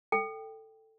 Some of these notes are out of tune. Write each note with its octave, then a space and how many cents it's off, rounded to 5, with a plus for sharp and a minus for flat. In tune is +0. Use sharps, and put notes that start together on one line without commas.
A4 +5 G5 +0